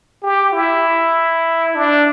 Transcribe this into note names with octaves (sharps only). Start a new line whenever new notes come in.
G4
E4
D4